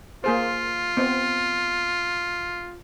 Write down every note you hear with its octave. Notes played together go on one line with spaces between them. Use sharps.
A#3 F4 G#4 C5
B3 C4